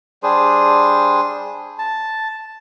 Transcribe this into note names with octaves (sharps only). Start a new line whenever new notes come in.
G3 D4 G#4 C5
A5